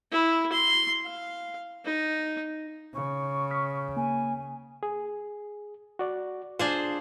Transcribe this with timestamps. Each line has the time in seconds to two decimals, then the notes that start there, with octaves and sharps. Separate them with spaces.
0.12 E4
0.53 C6
1.05 F5
1.85 D#4
2.95 C#3 C#6
3.50 D#6 F6 B6
3.97 A#3 G#5
4.83 G#4
5.99 F#4 D5
6.59 D4 F4 G#4 C5 D5